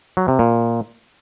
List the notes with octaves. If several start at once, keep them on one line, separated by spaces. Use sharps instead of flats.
F#3
C3
A#2